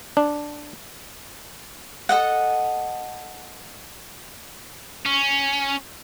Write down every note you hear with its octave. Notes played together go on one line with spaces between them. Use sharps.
D4
A4 D#5 F#5
C#4